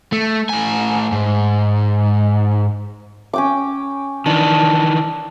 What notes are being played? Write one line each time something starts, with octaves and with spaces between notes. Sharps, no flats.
A3
A2 G#5
G#2
C#4 G5 D6
D#3 E3 D4